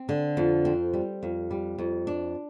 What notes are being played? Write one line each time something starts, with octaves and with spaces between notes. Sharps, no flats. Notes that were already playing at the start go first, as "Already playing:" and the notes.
Already playing: C4
D3
F2
C4
G3
F2
G3
F2
D4